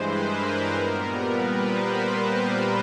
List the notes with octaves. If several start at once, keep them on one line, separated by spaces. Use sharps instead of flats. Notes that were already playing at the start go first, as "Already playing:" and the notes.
Already playing: G2 E3 G#3 B4 C5
A#4
A#2 G3 B3
B4
C5